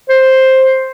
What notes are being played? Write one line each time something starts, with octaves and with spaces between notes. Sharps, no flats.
C5